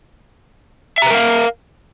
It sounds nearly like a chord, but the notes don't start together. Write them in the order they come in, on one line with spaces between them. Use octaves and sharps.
E5 A#5 B4 A#4 F5